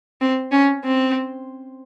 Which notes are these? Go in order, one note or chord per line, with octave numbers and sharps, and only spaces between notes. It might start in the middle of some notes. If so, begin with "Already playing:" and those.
C4
C#4
C4